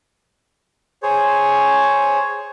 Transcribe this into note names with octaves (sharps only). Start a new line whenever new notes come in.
G#4 C5 C#5